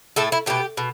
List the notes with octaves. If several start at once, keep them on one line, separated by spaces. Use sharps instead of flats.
A2 A3 A4
E4
B2 A3 G4
B2